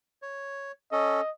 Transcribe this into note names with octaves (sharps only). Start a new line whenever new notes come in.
C#5
C#4 A4 D#5